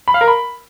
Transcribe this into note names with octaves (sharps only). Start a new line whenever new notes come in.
B5
F5
A#4
B5